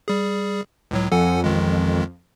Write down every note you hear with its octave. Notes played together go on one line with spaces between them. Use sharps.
G3 G#4
C#2 A2 F#3
F2 A4 F#5 G#5
A1 D#3 G#3